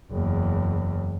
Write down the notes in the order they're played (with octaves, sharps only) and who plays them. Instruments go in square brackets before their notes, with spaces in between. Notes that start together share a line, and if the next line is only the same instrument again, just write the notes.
[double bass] F#1 E2